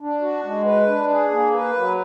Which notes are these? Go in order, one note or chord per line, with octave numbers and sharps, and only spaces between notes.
D4
F#4
G#3
B4
D4
G#4
A#3
B4
F#3